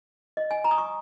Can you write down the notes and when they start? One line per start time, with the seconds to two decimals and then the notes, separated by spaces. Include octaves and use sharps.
0.37 D#5
0.51 G#5
0.64 A#5
0.71 D#6
0.78 C#6